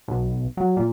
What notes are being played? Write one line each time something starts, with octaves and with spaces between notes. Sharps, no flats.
B1
F#3
A#2